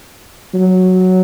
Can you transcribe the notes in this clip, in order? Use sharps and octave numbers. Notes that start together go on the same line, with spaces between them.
F#3